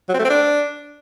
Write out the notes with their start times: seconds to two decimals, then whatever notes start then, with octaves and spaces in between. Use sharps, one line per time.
0.09 F#3
0.14 C4
0.19 A3
0.24 C4
0.30 D4